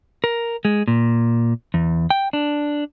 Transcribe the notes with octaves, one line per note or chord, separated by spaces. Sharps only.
A#4
G#3
A#2
E2
G5
D4